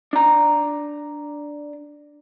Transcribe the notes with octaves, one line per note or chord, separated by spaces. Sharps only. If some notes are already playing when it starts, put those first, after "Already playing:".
D4 A#5